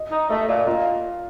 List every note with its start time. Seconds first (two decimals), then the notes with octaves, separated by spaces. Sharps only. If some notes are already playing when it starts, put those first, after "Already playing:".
Already playing: D#5
0.12 D#4
0.30 A3 D#5
0.49 A#2
0.67 A#3 F4